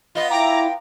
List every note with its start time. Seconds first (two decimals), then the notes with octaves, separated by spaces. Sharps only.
0.15 B3 F4 D#5
0.30 E4 G5 A#5 D6